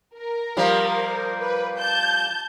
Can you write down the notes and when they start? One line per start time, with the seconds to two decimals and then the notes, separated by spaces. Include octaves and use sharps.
0.17 A#4
0.57 F3 G3 A#3
1.40 B4
1.78 A5 G6